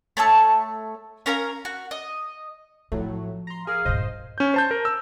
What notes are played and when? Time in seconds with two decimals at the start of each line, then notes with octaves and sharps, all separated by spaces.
0.17 A3 C#5 A5 E6
1.26 C#4 A#4 F5 A#5
1.65 F#4
1.91 D#5
2.92 A2 F3 F#3 A3
3.47 A#5 C6
3.67 G#4 A#4 F5
3.85 G2 A#2 C5 D#5
4.38 C#4 G6
4.54 C5 A5 G6
4.71 A#4
4.85 E6